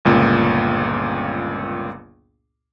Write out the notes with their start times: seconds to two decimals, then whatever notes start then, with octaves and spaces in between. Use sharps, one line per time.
0.05 G1 C#2 A#2